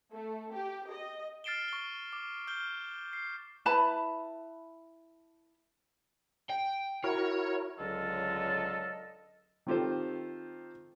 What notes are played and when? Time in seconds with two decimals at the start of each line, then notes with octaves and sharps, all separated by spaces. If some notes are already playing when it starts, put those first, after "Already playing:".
0.13 A3
0.54 G4
0.91 D#5
1.44 F6 A6 C7 D7 E7 G7
1.68 C#6 G7
2.13 D6
2.47 F6 G6 G7
3.13 C7
3.66 E4 B4 A5 B5
6.49 G5
7.04 E4 F#4 A#4 C#5
7.79 C#2 D3 F#3 F4 A4 D#5
9.67 D#3 C4 F4 G4 A4 C5